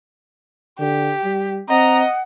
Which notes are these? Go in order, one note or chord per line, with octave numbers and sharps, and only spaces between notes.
D3 G4
G3
C4 D#5 F#5 A#5